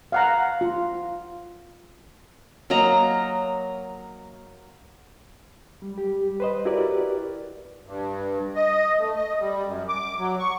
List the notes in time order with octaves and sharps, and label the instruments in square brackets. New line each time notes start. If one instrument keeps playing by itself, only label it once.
[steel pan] F5 F#5 A#5
F4
[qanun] F#3 A#3 D#5 A#5
[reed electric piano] G3
G3 G4
B4 C5 D#5
E4 F#4 G4 A#4 B4 D5
[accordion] G2
D#5
A3
D#5
G3
F#2
D6
F#3
C#6